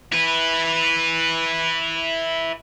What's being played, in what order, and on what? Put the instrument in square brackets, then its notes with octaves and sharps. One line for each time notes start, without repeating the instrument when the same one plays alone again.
[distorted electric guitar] E4 B4